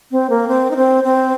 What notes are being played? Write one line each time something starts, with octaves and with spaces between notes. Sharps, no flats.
C4
A#3
C4
D#4
C4
C4